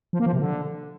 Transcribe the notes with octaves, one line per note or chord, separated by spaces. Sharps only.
F3
A#3
F3
C3
D3